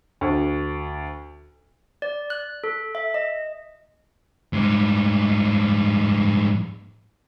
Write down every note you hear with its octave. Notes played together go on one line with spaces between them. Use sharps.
D2
D5
F#6
A4
E5
D#5
G#2 G3